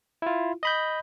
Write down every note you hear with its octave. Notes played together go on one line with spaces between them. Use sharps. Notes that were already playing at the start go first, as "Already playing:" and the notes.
E4 F4
D#5 B5 G6